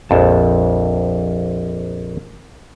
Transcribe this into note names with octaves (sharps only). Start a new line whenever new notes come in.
A#1 F2 A5